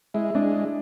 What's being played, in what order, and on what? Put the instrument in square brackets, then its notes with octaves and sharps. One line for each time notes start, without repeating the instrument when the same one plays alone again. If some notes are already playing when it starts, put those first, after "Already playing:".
[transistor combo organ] G#3 [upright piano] E4
[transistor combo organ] G#3 [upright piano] D4